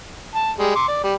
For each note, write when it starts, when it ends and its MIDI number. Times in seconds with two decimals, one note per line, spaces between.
0.35 0.51 81
0.58 0.74 55
0.58 0.74 56
0.75 0.88 84
0.75 0.88 86
0.88 1.02 74
1.04 1.14 55